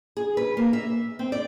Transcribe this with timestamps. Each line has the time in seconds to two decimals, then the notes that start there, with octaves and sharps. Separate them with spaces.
0.17 G#4
0.37 B4
0.57 A#3
0.73 E5
1.19 C4
1.32 D5